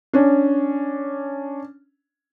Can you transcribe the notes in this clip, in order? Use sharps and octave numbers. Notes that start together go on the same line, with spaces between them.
C#4 D4